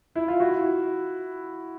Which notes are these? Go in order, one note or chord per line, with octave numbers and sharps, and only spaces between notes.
E4
F4
E4 F#4